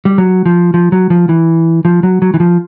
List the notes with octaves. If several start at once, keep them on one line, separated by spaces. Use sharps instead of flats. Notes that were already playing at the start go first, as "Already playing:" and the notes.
G3
F#3
F3
F3
F#3
F3
E3
F3
F#3
F#3
E3
F3